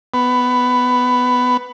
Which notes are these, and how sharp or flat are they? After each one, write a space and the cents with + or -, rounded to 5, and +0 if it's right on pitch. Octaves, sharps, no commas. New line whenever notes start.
B3 +10